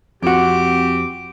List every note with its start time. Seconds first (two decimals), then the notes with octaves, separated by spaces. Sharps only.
0.22 F2 C4 F#4 G4 D6